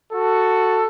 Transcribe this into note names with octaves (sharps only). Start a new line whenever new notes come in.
F#4 A4